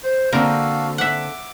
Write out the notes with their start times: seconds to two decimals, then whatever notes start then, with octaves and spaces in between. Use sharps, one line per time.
0.03 C5
0.33 D3 A#3 C4 F#4 A4 A#4 F5
0.98 E5 F#5 D6